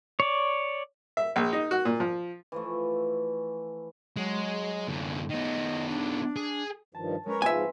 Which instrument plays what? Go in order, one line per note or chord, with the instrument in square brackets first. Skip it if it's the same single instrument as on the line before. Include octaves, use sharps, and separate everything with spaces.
[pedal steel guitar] C#5 D5
[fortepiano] E5
A#1
D#4
F#4
A#2
F3
[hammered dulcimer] E3 F3 A3
[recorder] F#3 [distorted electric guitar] G#3
[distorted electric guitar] F#2 D3
[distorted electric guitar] D#3 B3 [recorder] D#5
[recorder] D4
[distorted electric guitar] G#4
[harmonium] G2 D#3 F3 [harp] A5
[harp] G#3 C#4 B4 [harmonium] A#4 C#5
[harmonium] G#2 F3 [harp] C4 [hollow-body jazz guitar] E5 G#5
[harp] F4